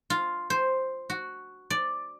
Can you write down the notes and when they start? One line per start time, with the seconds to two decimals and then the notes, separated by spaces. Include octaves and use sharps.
0.10 F4
0.50 C5
1.10 F#4
1.70 D5